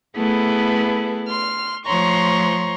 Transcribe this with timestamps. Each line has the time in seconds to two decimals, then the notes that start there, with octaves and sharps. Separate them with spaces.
0.16 A3 B3 E4 G#4 A4 B4
1.28 C6 F6
1.87 F3 A3 C#5 A#5 C6 C#6